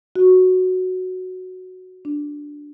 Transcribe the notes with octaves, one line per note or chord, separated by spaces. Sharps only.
F#4
D4